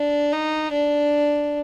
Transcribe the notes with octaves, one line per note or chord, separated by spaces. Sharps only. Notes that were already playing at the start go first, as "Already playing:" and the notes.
Already playing: D4
D#4
D4